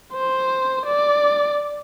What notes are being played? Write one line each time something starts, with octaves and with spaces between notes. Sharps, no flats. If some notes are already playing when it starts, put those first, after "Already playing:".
C5
D5